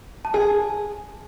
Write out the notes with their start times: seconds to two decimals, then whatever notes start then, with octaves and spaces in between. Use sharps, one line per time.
0.25 A5
0.34 G#4 G#5